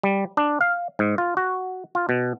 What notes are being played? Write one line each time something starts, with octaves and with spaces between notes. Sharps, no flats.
G3
D4
F5
G#2
F4
F#4
F4
B2